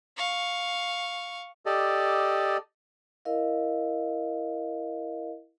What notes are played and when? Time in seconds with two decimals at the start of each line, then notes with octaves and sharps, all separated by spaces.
0.17 F5 C#6
1.66 G4 A4 D5 D#5
3.25 E4 A#4 D#5 F5